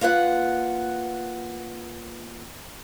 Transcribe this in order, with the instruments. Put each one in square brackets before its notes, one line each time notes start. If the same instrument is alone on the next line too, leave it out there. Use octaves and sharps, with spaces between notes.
[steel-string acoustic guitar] A#3 F4 B4 F#5